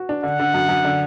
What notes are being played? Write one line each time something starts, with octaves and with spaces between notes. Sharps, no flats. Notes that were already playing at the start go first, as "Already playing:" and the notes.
Already playing: F#4
D4
D3 F#5
D3
F#2
F#2
D3